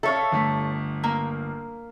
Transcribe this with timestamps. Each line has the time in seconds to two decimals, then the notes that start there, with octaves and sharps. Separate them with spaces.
0.03 A4 C#5 E5 F5
0.32 G1 A3 B6
1.04 A#3